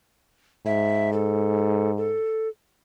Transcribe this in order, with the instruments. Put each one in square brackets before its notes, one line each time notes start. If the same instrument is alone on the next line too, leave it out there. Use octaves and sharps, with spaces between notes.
[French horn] G#2 [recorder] E5
[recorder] A4
A4